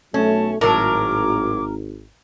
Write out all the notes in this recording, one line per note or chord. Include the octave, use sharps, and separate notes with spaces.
B1 F#3 A3 C#4 A5
G#1 A2 F#3 A#4 D6